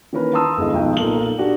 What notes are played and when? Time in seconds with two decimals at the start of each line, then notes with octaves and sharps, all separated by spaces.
0.13 D#3 E3 A#3 C#4 A#4 B4
0.33 F5 A5 A#5 C6 D#6 E6
0.57 G1 G#3 E4 G#4 D#5 F5
0.73 B1 F3 D#4 G5
0.97 B1 A#2 A#3 A4 F#7
1.38 D4 F#4 G4